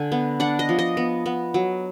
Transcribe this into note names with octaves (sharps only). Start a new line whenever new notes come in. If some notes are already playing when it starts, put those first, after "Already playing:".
Already playing: D3 G#5
B3
D4 F#5
D#5
F3
D#5
B3
B3
F#3